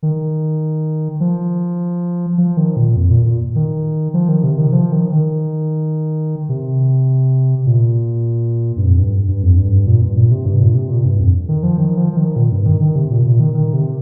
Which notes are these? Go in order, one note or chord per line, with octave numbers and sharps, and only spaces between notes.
D#3
F3
F3
D#3
A#2
F2
A#2
A#2
D#3
F3
D#3
C3
D#3
F3
D#3
D#3
C3
A#2
G2
F2
G2
G2
F2
G2
G2
A#2
G2
A#2
C3
G2
A#2
C3
A#2
G2
F2
D#3
F3
D#3
F3
F3
D#3
A#2
G2
D#3
D#3
C3
A#2
A#2
D#3
D#3
C3